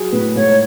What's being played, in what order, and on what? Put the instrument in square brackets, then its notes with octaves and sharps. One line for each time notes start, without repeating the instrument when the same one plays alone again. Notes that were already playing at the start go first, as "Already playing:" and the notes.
Already playing: [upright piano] F#3 G#4
[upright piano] A2 [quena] B4
[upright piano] G#2 [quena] C#5